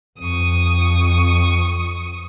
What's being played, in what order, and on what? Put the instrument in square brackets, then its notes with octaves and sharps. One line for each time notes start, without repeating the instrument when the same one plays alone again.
[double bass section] F2 [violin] C#6 D#6